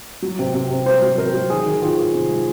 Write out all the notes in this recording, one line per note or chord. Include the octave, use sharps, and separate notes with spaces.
F#3
C3
C3
C3
F#3 C5
F#3
C3 A#4
F#3
D#3 G#4
D#3
D#3 F4
D#3
C3
G#3